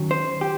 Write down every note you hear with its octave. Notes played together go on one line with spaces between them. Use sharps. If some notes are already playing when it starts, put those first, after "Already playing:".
Already playing: F#2 D#3 F#3
C5
G4